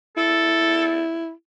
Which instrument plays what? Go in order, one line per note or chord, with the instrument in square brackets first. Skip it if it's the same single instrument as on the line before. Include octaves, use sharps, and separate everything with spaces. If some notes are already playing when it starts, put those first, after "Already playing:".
[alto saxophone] E4 [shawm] A4